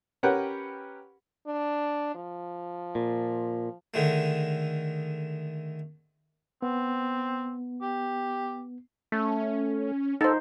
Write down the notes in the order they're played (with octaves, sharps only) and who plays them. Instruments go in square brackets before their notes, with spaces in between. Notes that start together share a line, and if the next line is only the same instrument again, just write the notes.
[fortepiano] C#4 G4 A#4 B4 F#5 G5
[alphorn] D4
F3
[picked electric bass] A#2
[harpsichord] D3 D#3 G#3 A3
[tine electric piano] B3 [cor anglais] C4
[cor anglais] G4
[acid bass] A3 [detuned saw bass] C#4
[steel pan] D#4 C5 [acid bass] A4